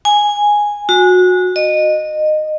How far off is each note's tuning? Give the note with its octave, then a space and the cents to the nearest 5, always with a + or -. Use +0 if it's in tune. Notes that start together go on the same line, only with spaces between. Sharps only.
G#5 -5
F#4 -25
D#5 -20